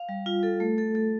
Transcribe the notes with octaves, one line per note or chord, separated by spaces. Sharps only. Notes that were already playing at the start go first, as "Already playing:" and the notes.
Already playing: F5
G3
F4
A4
A3
A4
A4